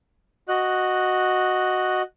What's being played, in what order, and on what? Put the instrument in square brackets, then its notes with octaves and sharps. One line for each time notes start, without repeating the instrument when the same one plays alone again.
[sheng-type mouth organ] F#4 D#5 F#6